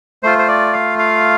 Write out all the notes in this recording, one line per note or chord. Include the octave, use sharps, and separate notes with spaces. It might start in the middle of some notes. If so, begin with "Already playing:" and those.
A3 F4 C5
C5
D5
F5
F5